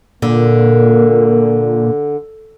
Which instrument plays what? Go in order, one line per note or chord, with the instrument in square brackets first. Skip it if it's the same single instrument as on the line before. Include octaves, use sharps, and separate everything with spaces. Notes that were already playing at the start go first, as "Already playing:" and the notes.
[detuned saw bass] A#2 [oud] D3 [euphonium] A#3